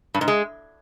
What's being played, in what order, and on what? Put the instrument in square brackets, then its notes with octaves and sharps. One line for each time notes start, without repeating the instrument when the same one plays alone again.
[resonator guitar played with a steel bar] G2
G#2
G#3